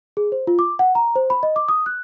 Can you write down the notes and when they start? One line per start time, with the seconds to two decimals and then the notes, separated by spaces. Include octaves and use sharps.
0.17 G#4
0.32 C5
0.47 F4
0.59 D6
0.79 F#5
0.95 A#5
1.16 C5
1.30 B5
1.43 D#5
1.56 D6
1.69 D#6
1.86 F#6